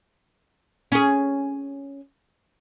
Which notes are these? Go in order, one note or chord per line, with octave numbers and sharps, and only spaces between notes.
C#4 G#4